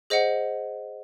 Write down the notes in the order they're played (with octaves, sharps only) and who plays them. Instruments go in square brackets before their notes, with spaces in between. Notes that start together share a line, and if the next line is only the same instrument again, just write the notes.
[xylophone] G#4 C5 D#5 F#5